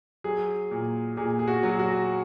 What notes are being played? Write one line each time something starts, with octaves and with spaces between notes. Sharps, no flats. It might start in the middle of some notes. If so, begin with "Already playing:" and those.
F#3 G#4
A#2
A#2 G#4
G#4
F#4
F#3
F#4